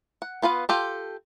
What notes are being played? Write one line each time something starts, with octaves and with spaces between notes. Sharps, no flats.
F#5
B3 F4 B4 F5
F4 G4 A4